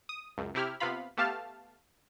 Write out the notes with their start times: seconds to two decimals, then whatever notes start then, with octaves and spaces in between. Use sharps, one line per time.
0.09 D#6
0.38 C#2 F#2
0.54 C3 E4 G4 F6
0.80 C3 B3 F4 F5 B5
1.17 A3 B3 G4 F5 A5 F6